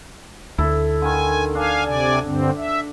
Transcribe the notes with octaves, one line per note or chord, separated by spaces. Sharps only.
D2 E4 A4
D3 D#3 G#5
D4 F5 G#5
C3 D5 G#5
G2 D3 C4
E5